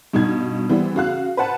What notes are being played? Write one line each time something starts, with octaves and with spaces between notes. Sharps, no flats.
G2 B2 D#4 G#6
E3 G3 B3 C4
C#3 F#4 F5 F#6
B4 C5 F#5 A5